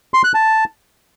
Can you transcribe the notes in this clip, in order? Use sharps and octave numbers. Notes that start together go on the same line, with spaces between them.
C6
F#6
A5